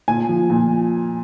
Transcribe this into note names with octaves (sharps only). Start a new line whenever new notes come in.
A#2 G#5
F3
A#2